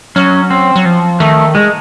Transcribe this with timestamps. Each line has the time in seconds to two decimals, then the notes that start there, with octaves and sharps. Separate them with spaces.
0.16 F#3 C#4
0.51 C4
0.76 F#3
0.86 F3
1.20 D#3 A3
1.55 G#3